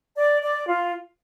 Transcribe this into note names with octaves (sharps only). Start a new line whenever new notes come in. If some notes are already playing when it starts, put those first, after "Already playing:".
D5
D5
F4